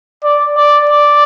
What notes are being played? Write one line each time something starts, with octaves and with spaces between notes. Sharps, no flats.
D5
D5
D5